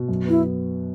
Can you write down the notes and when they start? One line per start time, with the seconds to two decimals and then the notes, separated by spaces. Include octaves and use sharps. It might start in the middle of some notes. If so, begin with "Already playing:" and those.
Already playing: B2
0.08 F#2
0.25 B3 E4